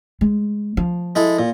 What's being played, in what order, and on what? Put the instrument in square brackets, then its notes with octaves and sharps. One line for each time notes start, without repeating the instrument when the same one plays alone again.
[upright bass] G#3
F3
[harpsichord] G#3 E4 A4
A#2